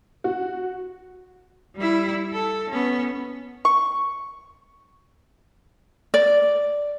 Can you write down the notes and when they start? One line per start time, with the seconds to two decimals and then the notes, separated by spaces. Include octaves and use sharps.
0.24 F#4
1.76 G3 E4
2.33 A4
2.70 B3 C#4
3.65 C#6
6.14 D5